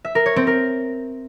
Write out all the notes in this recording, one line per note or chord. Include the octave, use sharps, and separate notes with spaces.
E5
A#4
C#5
C4
A#4